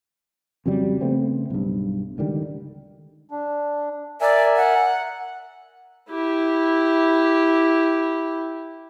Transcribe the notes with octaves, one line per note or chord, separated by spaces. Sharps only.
F2 C#3 F#3 G3
C#3 A3 B3 C4
B1 G2
C#2 D3 D#3 G3
D4
A#4 D5 E5 G#5
F#5
E4 G4